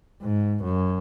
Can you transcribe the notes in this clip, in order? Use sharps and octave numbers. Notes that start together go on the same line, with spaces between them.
G#2
F#2